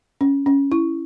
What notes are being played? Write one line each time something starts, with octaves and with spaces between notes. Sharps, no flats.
C#4
C#4
E4